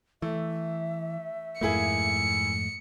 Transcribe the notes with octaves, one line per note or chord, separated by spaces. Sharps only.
E3 A3 E5
F2 G#2 A3 A#3 E4 G#4 C#7